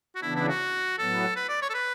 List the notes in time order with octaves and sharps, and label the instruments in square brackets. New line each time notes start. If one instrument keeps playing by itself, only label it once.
[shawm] F#4
[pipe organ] C#3 E3 B3 D4 [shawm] E4
[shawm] E4
F#4
[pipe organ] A2 F#3 B3 [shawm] A4
[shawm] B4
D5
C#5
A4
B4